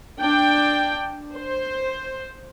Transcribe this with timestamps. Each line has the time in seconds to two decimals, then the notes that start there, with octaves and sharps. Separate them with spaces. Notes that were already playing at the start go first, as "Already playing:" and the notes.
0.21 D4 G5
1.35 C5